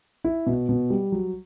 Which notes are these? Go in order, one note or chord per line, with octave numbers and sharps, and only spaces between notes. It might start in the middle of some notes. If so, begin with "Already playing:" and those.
E4
B2
B2
G3
F#3